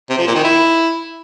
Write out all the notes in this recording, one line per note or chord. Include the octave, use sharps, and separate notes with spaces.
C3
F3
A#2
D#3
E4